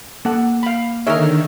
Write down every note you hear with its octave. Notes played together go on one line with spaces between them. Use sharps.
A#3 A4 F#5
F5 B5
D3 D#3 D#4 G#4 A#4 C#5 E5